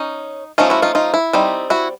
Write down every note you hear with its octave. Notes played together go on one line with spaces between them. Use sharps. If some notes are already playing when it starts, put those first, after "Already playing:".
Already playing: C#4 D#4
F3 A3 C#4 D#4 F4
E4 F#4
D#4 F4
D#4 F4
E4
G3 C4 D#4
E4 F#4